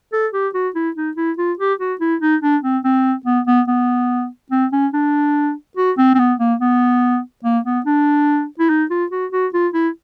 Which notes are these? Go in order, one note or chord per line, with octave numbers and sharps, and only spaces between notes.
A4
G4
F#4
E4
D#4
E4
F4
G4
F#4
E4
D#4
D4
C4
C4
B3
B3
B3
C4
C#4
D4
F#4
C4
C4
B3
A#3
B3
A#3
B3
D4
E4
D#4
F4
F#4
F#4
F4
E4